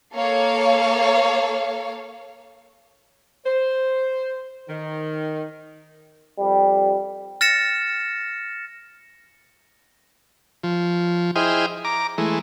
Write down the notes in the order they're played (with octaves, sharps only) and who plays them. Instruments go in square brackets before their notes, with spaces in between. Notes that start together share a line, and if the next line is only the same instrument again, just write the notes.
[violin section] A#3 A4 C#5 F5
[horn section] C5
D#3
[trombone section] F2 G3
[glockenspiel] F6 A6 A#6 C#7 E7
[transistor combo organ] F3
E4 G#4 C5 D#5 G5 F6
A#5 D6
E3 G#3 A3